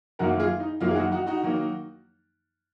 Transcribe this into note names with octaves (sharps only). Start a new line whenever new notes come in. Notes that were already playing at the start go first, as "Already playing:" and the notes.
F#2 D#3 F#3 A#3 F#4 A#4
F4 G#4
D#4
F#2 D#3 F#3 A#3 F4
G#4
D#4 F#4
D#4 F#4
D#4 F#4
D#3 F#3 A#3